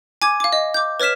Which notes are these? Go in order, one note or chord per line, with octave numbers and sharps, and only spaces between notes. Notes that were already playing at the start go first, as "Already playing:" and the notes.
G#5 D6 G#6
F5 D6
D#5
D6 G6
B4 C#5 F6 B6 E7